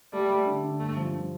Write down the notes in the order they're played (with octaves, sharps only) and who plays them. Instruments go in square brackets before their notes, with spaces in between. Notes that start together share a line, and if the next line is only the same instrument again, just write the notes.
[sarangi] G3 [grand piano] A3
[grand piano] A3
D3
D3
[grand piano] G2 [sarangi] A3
[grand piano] F3
D3